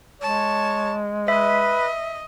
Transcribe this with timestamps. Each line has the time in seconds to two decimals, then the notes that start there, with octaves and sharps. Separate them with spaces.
0.22 G#3 C#5 A5
1.28 B4 D#5 E5